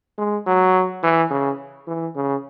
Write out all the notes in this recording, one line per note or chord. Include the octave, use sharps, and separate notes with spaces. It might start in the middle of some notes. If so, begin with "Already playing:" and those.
G#3
F#3
E3
C#3
E3
C#3